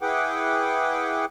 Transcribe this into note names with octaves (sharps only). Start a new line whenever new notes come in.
E4 G#4 B4 F#5 G5 D6